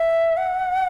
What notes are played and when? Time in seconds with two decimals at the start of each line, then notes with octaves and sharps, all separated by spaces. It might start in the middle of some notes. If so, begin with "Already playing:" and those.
Already playing: E5
0.37 F#5